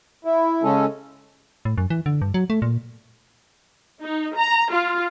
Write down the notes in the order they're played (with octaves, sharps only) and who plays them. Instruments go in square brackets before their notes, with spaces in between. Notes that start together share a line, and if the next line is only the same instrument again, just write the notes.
[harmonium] E4
C#3 G#3 C#4 A4
[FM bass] A2
F#2
E3
D3
G2
F#3
A3
A#2
[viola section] D#4
A#5
F4